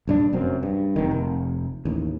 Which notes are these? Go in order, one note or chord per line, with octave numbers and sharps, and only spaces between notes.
A#1 G2 D4
F1 F#2 C4
G2
F1 C3 D#3
F1
A1 D#2